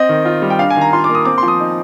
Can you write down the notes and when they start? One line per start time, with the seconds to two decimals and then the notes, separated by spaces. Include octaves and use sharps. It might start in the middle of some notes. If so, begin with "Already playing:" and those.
Already playing: C4 D#5
0.09 D#3
0.25 F4
0.42 G3
0.50 G5
0.59 D4 F5
0.70 G#5
0.77 D#3 A#5
0.93 F4 C6
1.04 D6
1.09 A#3
1.15 D#6
1.25 C4 D6
1.38 C6
1.43 F3
1.48 D#6
1.60 D#4